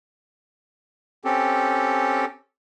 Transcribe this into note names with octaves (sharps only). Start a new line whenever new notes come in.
C4 C#4 G4 A4